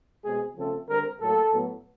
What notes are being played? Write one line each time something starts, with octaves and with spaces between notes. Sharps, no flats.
B2 G#3 C4 G#4
C#3 F3 A3 C4 A4
D3 G3 C4 A#4
A2 F#3 A#3 A4
A2 F#3 B3